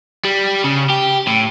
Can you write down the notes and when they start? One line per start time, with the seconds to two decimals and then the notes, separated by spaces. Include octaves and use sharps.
0.24 G3
0.64 C#3
0.89 G4
1.27 A2